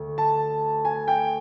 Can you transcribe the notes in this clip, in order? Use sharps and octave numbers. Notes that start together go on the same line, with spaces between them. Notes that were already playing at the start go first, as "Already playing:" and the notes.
Already playing: D2
A5
G#5
G5